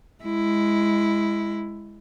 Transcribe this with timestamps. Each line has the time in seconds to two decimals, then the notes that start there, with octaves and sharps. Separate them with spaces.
0.24 G#3 E4